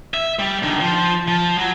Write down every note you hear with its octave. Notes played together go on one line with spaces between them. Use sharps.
E5
G3
D#3 D4
F3
F3
F#3